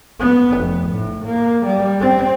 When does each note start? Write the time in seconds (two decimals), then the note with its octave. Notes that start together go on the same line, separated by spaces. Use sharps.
0.20 B3
0.59 F1
0.90 A2
1.25 A#3
1.66 G3
2.01 C4